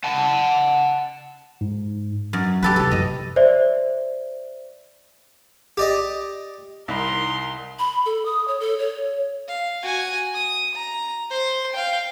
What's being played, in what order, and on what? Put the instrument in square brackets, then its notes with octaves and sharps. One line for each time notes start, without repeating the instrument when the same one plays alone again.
[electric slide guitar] F#5 A5
[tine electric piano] G#2
[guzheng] F#2
[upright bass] D#3 [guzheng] G4 A4 B4
[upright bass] C2 F#2 [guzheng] A4
[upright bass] F#2 D3 [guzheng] D#5
[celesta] C5 D5 E5
[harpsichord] G4 D5 D#5
[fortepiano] C2 D#4 B5 [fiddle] A#4 C6
[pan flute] B5
A4
D#6
C#5
A4
C#5
[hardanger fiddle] F5
F#4 G#5
D#6
A#5
C5 C6
F5 G5